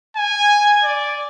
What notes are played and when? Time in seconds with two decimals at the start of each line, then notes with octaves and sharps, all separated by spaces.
0.17 G#5
0.84 D5